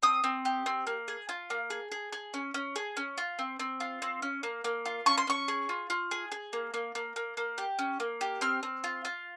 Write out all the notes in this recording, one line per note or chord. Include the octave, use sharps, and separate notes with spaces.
C4 D#6
C4
G4
C4
A#3
G#4
F4
A#3
G#4
G#4
G#4
C#4
C#4
G#4
C#4
F4
C4
C4
F4
C4
C#4
A#3
A#3
F4
C#4 C#6
C6
C#4 C#6
G#4
F4
F4
G#4
G#4
A#3
A#3
A#3
A#3
A#3
G4
C#4
A#3
G4
C4 F6
C4
F4
F4